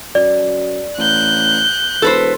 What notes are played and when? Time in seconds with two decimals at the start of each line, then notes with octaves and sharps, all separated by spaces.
0.15 F#2 D5
0.98 A1 F#6 G6
2.02 E1 A4 B4 C5